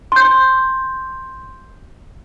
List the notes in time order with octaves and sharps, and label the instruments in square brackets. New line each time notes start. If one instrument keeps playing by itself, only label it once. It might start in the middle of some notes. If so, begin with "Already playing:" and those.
[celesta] C6 G6